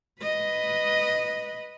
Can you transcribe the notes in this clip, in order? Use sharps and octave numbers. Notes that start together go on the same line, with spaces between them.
B4 D#5